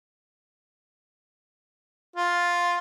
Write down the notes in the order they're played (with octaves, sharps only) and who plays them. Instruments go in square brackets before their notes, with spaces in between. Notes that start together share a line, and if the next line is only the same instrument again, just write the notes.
[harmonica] F4